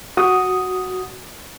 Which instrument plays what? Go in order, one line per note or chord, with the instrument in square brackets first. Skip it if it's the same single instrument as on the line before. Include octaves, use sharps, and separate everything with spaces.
[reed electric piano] F#4 D#6